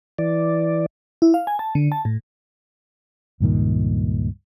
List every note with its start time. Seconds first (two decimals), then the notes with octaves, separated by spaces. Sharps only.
0.18 E3 D5
1.22 E4
1.34 F5
1.47 G#5
1.59 A5
1.75 D3
1.92 A5
2.05 A2
3.40 C#2 G2 A#2 D#3